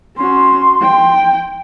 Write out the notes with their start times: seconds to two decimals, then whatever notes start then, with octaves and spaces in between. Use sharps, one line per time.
0.17 C#4 F#4 C6
0.82 G5